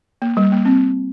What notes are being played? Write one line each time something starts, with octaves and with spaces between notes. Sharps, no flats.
A#3
G3
A#3
C4